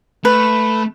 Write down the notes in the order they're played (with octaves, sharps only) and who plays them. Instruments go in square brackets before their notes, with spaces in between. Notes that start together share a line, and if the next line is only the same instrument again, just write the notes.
[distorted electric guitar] A3 [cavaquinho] B4